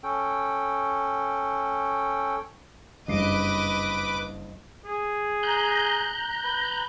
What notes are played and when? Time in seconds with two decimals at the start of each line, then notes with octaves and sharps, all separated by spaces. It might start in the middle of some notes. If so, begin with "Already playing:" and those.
0.03 C#4 A4 G5
3.08 F#1 G2 B4 D#5 D6 C7
4.85 G#4
5.43 A#5 F#6 G6
6.44 B4